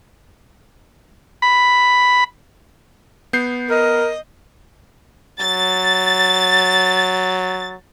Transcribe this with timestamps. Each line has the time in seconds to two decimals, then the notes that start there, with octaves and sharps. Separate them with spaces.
1.42 B5
3.33 B3 G6 C7
3.70 A#4 D#5
5.40 F#3 A6